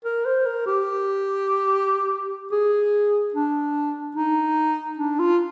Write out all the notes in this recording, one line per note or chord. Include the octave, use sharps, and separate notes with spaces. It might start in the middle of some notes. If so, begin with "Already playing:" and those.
A#4
C5
A#4
G4
G#4
D4
D#4
D4
F4